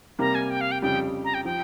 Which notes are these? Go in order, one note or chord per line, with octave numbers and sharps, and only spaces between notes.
C3 G3 A#3 A#5
G#5
G5
F5
G5
F2 C#3 G3 G5
A#5
G5
F3 G5